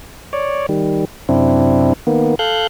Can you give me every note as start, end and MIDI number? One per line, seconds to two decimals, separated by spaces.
0.33 0.66 73
0.33 0.66 74
0.69 1.05 51
0.69 1.05 55
1.29 1.93 42
1.29 1.93 48
1.29 1.93 60
1.29 1.93 62
1.29 1.93 64
2.07 2.35 51
2.07 2.35 58
2.07 2.35 59
2.39 2.67 69
2.39 2.67 77
2.39 2.67 90
2.39 2.67 91